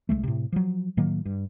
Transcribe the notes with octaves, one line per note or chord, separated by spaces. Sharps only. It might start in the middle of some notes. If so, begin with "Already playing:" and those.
C2 G2 G#3 A3
A2 C3
F3 F#3
A2 D#3 F#3 A#3
G2